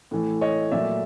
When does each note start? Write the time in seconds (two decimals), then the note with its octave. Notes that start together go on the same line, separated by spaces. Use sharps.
0.11 A2 E3 A3
0.41 C#5 D#5
0.72 A#2 F#3 A3 D5 E5